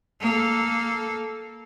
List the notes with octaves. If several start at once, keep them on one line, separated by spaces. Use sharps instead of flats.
A#3 A4